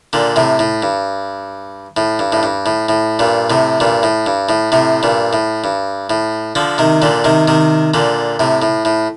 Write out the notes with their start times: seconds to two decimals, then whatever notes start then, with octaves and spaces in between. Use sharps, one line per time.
0.13 A#2 D3
0.36 A2 C3
0.59 A2
0.82 G2
1.97 A2
2.19 G2
2.32 A2
2.43 G2
2.66 A2
2.89 A2
3.19 G2 A#2
3.50 A2 C3
3.80 G2 A#2
4.03 A2
4.26 G2
4.49 A2
4.72 A2 C3
5.03 G2 A#2
5.33 A2
5.64 G2
6.10 A2
6.55 D3 F3
6.78 C3 D#3
7.02 A#2 D3
7.24 C3 D#3
7.48 C3 D#3
7.94 A#2 D3
8.39 A2 C3
8.62 A2
8.85 A2